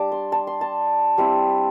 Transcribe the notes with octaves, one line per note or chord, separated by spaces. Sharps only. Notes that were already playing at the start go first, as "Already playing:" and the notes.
Already playing: G3 D4 A5 D6
C6
A5
C6
A5
G3 C4 E4